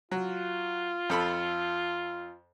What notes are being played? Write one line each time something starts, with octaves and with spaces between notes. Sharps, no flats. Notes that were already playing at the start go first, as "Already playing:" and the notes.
F#3 F4
F2 A4 B5